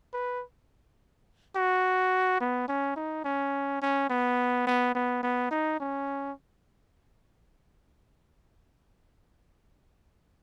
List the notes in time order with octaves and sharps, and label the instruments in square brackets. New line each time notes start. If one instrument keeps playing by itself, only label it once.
[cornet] B4
F#4
B3
C#4
D#4
C#4
C#4
B3
B3
B3
B3
D#4
C#4